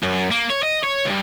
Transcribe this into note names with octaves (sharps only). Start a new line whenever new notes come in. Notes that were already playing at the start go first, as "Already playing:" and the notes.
F#2
A#3
C#5
D#5
C#5
C#2 G2